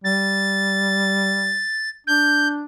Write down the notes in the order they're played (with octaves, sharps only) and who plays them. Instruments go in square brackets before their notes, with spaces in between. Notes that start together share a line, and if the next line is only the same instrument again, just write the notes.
[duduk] G3 [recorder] A6
[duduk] D4 [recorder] G6